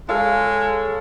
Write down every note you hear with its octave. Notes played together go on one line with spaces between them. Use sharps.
G#3 A4 C#5 F5